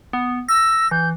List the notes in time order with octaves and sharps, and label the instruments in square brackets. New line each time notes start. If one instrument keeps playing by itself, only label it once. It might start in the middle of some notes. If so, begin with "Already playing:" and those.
[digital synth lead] B3
[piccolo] E6 [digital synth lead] A#6
[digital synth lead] E3 [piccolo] G6